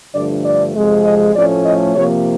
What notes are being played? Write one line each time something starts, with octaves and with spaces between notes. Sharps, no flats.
G2 D3 F3 A3 D5
D5
F2 C3 F3 G#3
D#5
A2 F3 A3 C#4 D5
D#5
C3 F3 A#3 C#5